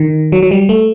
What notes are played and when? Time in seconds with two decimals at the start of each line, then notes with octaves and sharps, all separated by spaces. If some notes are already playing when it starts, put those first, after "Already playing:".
Already playing: D#3
0.32 F#3
0.43 F#3
0.51 G3
0.69 A3